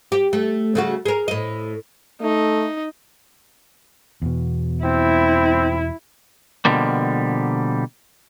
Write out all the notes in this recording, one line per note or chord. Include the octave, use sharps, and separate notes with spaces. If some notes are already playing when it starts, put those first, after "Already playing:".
G4
A3
C#3 A3 F#4
G#4 A#4
A2 D#5
A3 D#4
E2 B2
C4 E4
B2 D3 F3 G3 A#3